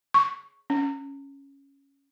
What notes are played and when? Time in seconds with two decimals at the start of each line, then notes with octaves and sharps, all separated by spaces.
0.14 C#6
0.70 C#4